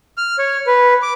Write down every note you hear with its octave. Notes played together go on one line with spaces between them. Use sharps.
F6
C#5
B4
D6